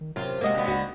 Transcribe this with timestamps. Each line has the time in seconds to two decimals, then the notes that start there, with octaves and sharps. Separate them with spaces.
0.01 D#3
0.16 D1 F#2 C3 F4
0.41 C3 G#3 A#3 F#4 D#5
0.54 D3 B3
0.68 C#2 C#3 D#4 F#4